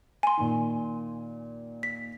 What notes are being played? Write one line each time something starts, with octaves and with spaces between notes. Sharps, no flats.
G#5 C6
A#2 D#3
B6